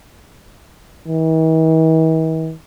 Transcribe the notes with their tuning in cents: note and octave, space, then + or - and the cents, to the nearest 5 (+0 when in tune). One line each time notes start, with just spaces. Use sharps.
E3 -45